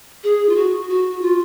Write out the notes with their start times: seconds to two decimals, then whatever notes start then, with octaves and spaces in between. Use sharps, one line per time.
0.23 G#4
0.49 F4
0.55 F#4
0.89 F#4
1.21 F4